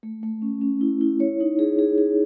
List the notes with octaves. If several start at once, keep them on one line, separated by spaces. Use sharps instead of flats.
A3
A3
C#4
C#4
E4
E4
C#5
D#4
G#4
G#4
G#4